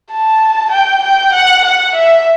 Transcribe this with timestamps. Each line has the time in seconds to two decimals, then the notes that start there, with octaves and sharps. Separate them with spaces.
0.11 A5
0.72 G5
1.03 G5
1.33 F#5
1.65 F#5
1.95 E5